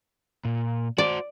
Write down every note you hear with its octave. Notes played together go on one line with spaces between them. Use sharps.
A#2
F#4 C5 D5